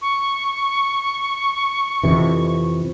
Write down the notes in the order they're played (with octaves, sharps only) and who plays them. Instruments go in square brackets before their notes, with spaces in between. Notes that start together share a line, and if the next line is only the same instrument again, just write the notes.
[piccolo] C#6
[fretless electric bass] F2 C3 E3